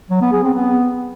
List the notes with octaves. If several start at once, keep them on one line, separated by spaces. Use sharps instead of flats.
F#3
B3
G#4
C4
B3